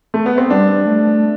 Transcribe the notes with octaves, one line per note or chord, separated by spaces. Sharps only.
A3
B3
C4
G3 D4
A3